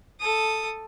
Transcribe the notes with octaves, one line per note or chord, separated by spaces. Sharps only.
A4 D#6